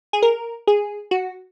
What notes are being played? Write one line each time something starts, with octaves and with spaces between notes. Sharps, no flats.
G#4
A#4
G#4
F#4